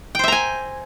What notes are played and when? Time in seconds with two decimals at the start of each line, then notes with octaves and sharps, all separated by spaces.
0.15 G5
0.19 C5
0.24 E5
0.28 A#5
0.32 G#5